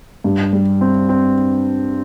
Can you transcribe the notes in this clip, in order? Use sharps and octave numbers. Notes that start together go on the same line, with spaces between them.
G2
G3
C4
C4